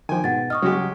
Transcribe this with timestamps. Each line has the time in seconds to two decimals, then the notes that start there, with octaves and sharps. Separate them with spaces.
0.09 D#3 F3 G5 G#5
0.24 G#2 B2 F#5 A6
0.50 D#5 C#6 D#6 F6
0.62 C#3 F#3 G#3 F#4 G4